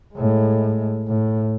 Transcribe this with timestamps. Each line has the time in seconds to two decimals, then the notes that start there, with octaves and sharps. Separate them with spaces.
0.15 A2 G#3
1.07 A2